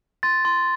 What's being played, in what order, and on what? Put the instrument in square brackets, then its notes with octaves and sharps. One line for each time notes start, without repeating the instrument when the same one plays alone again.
[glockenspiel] C6 A6
C6